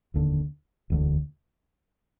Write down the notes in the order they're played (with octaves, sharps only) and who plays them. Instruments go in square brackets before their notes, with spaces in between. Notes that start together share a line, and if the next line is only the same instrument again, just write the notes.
[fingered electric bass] F1 D#2 D3
E1 D2 D3